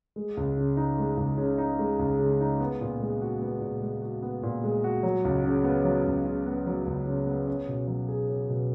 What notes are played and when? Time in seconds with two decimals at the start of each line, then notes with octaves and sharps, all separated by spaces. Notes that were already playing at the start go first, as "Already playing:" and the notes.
0.16 G#3
0.37 C#2
0.57 C#3
0.77 D#4
0.98 G#3
1.17 C#2
1.38 C#3
1.58 D#4
1.79 G#3
1.99 C#2
2.19 C#3
2.40 D#4
2.60 B3
2.81 A#2
3.00 G#3
3.21 F#4
3.41 B3
3.61 A#2
3.81 G#3
4.02 F#4
4.23 B3
4.43 A#2
4.64 G#3
4.84 F#4
5.03 F#3
5.25 C#2
5.44 C#3
5.64 B3
5.85 F#3
6.05 C#2
6.25 C#3
6.47 B3
6.67 F#3
6.87 C#2
7.06 C#3
7.27 B3
7.47 C#4
7.68 B2
7.88 F#3
8.09 G#4
8.29 C#4
8.50 B2